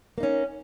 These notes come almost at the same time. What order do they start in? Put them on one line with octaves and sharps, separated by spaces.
A#3 D#4 C#4